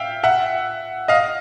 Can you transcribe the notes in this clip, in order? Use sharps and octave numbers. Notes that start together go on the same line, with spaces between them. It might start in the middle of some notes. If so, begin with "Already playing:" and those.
Already playing: E5 F5 G5
E5 F#5
D#5 F5